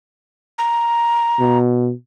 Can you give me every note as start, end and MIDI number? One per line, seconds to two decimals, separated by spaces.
0.58 1.58 82
1.39 1.92 47